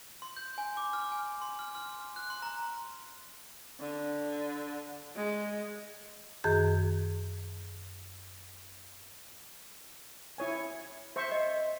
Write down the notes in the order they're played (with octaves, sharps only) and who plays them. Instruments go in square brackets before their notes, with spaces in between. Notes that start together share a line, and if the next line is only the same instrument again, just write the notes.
[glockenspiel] C6
G6
G#5
D6
F6
G#5
C6
F6
F6
F#6
C6
A#5
[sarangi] D3
G#3
[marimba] F#2 D#3 G#4 G6
[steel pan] E4 C#5 G#5
C5 E5 C#6
[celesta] D#5